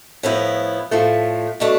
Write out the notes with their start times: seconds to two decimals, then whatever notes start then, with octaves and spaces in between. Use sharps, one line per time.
0.23 A2 F3 B3 E4
0.91 A2 F3 A3
1.60 B2 A3 D4